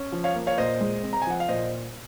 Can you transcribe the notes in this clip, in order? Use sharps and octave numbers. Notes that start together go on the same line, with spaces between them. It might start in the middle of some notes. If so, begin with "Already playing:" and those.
Already playing: C#4
F3
C#5 F5
A#3
C#5 F5
A#2 C5 D#5
G#3
C4
A#5
G#5
F3 F#5
F5
A#2 C5 D#5